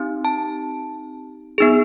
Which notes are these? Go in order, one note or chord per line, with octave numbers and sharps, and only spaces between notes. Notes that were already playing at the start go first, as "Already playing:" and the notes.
Already playing: C4 D#4 G4
A5
B3 D#4 G#4